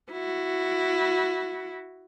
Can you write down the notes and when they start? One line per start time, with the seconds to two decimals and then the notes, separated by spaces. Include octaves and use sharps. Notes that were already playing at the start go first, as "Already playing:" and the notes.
0.12 E4 F#4